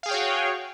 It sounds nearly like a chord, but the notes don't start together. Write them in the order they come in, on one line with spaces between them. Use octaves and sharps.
F5 G#4 G5 C#5 F#4